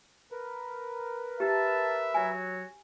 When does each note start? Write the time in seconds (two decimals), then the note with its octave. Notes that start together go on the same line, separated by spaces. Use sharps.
0.32 A#4 B4
1.40 G4 E5 A5
2.14 F#3 F#4 C#5 G#5